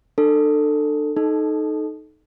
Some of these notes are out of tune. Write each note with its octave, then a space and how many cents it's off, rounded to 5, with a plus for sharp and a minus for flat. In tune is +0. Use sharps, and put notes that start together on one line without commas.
D4 +35 A4 +20
D#4 -5 A4 -20